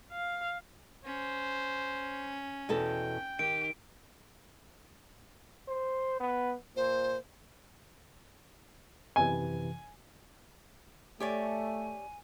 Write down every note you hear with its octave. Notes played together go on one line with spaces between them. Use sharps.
F5
C#4 C5
E2 B2 A4 G5
D#3 G4 D7
C5
B3
A#2 C5
F#2 C3 E3 G#5
A3 G4 C#5 D5 G#5